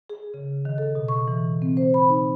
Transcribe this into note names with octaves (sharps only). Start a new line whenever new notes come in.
G#4
C#3
D#3
A4
B2
C#6
E3
C4
C5
B5
D#4